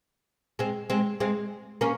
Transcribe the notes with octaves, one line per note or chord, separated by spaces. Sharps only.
G#3 C4
G#3 C4
G#3 C4
A#3 C#4